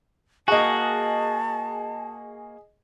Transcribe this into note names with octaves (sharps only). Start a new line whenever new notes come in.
A#3 F#4 G#4 D#5 A5